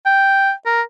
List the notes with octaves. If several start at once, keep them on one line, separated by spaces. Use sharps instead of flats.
G5
A#4